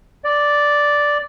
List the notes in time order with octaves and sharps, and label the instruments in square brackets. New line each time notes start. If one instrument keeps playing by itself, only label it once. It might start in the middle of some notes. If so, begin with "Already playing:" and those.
[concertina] D5